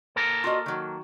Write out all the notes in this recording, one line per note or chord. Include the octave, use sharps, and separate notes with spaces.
A#3 A4 A#4
F4 F#4 D#5
D#3 F#3